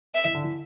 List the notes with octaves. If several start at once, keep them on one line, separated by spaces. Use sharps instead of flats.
E5
E3
D3
E3